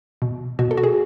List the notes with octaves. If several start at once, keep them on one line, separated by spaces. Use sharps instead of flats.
B2
B2 F#4
A4
F#4
G#4